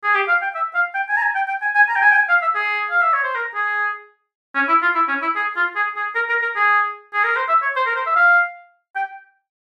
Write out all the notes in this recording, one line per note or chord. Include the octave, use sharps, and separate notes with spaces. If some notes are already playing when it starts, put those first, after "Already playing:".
G#4
G4
F5
G5
E5
F5
G5
G#5
A#5
G#5
G5
G5
G#5
G#5
A#5
G5
G#5
G5
G#5
F5
E5
G#4
F5
E5
C#5
C5
A#4
G#4
C#4
E4
F4
E4
C#4
E4
G#4
F4
G#4
G#4
A#4
A#4
A#4
G#4
G#4
A#4
C5
E5
C#5
C5
A#4
C5
E5
F5
G5